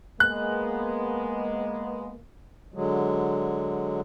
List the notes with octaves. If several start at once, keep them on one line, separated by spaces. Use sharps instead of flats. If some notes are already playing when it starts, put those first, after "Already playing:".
G#3 A#3 B3 F#6
D3 F#3 G#3